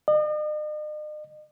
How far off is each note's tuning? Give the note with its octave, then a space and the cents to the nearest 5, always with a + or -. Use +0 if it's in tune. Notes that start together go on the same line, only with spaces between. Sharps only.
D#5 -45